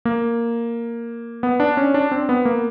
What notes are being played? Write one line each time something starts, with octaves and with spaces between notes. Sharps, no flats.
A#3
B3
D4
C#4
D4
C4
B3
A#3